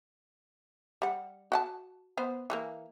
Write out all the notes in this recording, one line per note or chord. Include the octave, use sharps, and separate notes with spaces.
G3 F#5
F#4 F#5 A5
B3 C5
E3 G#3 A#3